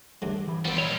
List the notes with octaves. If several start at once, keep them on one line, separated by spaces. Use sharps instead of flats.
D2 G2 F#3
E3 G4 B5
F3 G3 B3 C4
A#2 G3 C5 C#5 D#5 B5